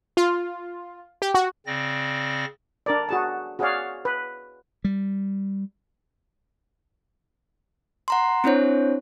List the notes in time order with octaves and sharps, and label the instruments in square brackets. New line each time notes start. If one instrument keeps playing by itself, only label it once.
[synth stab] F4
G4
F#4
[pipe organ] C#3 C4 D5 A#6
[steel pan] D4 A#4 D5
F#4 G#4 A5
F#4 G#4 C#5 D5 F5
B4
[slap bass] G3
[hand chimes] F#5 A#5 C6
C4 D4 E4 C5 C#5